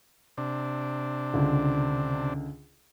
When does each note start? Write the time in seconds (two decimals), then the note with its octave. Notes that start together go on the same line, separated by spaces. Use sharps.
0.38 C3 D4
1.34 C#2 D3